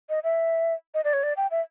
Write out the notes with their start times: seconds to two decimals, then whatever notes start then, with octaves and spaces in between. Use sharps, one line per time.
0.09 D#5
0.24 E5
0.94 D#5
1.04 D5
1.13 C#5
1.23 D5
1.37 G5
1.51 E5